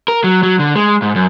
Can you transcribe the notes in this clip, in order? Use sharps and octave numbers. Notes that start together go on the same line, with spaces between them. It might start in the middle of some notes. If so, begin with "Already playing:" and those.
A#4
F#3
F#3
D3
G#3
G#2
F#2